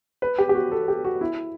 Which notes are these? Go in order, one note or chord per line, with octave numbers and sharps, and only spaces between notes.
B4
G4
G4
F#4
A4
G4
F#4
E4